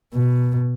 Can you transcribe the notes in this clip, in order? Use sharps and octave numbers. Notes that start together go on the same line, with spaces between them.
B2